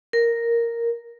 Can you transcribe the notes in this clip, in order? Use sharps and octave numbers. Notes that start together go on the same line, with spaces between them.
A#4